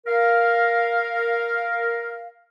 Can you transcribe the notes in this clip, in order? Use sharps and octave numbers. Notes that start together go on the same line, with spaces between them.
A#4 F5